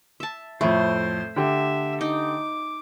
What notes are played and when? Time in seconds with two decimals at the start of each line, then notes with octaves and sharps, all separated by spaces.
0.20 E5 A5
0.61 F2 A2 A3 C5
1.36 D3 G4 E5
2.01 D#4 D6